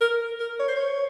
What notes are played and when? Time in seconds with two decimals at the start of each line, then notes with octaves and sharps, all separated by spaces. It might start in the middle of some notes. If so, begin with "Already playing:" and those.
0.01 A#4
0.40 A#4
0.60 C#5
0.68 C5
0.76 C#5